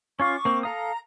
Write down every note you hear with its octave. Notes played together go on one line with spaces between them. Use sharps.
C#4 F4 F5 C#6 D6
A#3 C4
A4 F5 A#5 D#6